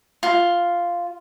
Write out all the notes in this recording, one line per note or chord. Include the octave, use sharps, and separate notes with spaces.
F4